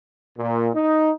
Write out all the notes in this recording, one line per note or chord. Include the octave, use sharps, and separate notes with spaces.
A#2
D#4